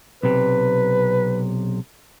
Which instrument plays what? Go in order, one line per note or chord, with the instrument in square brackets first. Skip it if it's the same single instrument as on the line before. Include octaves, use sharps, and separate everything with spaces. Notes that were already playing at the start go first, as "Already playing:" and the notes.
[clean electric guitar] B1 C3 [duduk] B4